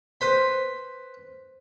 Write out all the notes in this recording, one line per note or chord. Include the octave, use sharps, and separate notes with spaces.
B4 C5 B5